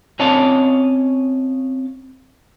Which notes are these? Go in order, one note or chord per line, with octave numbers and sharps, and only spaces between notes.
C4 C#4 C#5 D#5 F5 A5